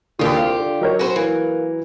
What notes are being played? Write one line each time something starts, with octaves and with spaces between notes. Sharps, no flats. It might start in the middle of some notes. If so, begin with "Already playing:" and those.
D#2 D3 D#3 F4 G4
C2 F5
D3
D#3 F#3 A#4 C#5
C#4 F#4 B4 C5
E3 A#3